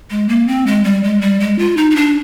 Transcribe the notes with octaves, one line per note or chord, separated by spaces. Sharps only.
G#3
A#3
C4
G#3
G3
G#3
G3
G#3
F4
D#4
D#4
D4